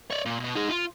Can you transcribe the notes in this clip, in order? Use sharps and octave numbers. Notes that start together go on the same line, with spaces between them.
C#5 D5
A#2
B2 B3
D#4 G#4
F4